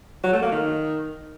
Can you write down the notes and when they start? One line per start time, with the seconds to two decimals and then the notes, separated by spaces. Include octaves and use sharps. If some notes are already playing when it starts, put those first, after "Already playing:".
0.24 F#3
0.33 A3
0.42 A#3
0.51 D#3